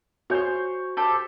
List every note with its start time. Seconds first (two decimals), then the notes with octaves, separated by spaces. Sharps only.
0.30 F#4 C5 C#5 G#5 G6
0.97 G4 A4 C5